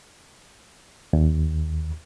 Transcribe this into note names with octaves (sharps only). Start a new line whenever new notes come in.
D#2